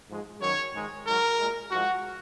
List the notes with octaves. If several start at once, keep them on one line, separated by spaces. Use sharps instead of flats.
G#2 F3 G#3
F#2 D#3 F#3 C#5
G#2 D#3 G#3
G#2 F#3 A#4
A#2 G#3
G#2 F3 G#3 F#4